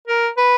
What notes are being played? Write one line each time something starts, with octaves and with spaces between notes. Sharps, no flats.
A#4
B4